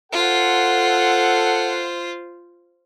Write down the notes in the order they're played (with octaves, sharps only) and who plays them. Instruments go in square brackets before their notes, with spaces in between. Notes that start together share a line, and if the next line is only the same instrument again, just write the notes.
[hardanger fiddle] F4 C5 [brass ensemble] A4 F#5